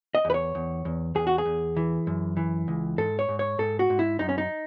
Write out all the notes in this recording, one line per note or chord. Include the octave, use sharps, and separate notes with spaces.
D#5
E2
B4
C#5
E2
E2
E2 G#4
F#4
G#4
E2
E3
F#2
E3
C#2
G#2 A4
C#5
G#2
C#5
G#2 A4
F#4
G#2
E4
F#2 D#4
C#4
D#4